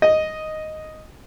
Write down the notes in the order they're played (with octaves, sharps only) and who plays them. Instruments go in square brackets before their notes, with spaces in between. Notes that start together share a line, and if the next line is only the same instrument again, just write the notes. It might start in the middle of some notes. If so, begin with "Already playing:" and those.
[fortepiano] D#5